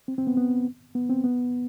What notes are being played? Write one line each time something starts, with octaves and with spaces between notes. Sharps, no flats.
C4
C4
B3
B3
B3
C4
B3